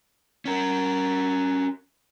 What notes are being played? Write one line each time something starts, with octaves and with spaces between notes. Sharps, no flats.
C#4 A#4